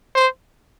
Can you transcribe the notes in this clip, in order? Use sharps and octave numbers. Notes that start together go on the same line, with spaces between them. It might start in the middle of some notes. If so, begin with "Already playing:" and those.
C5